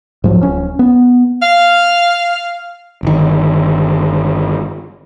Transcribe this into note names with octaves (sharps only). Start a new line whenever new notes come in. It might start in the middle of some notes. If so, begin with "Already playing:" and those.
G#2 F3 F#3
D1 C#4
B3
F5
G1 D#3